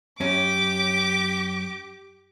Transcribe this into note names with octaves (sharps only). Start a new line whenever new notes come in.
F#2 C#4 G4 D6